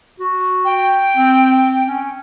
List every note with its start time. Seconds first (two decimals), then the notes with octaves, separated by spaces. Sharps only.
0.20 F#4
0.65 G5
1.17 C4
1.87 C#4